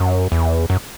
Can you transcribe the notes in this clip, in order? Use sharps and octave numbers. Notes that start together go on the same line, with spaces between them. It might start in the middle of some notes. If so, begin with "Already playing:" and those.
Already playing: F#2
E2
F#2